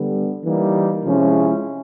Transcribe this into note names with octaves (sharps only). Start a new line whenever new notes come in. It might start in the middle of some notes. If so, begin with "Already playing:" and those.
Already playing: D3 G3 B3
E3 G3 A#3 D#4
C3 F3 G#3 C#4 E4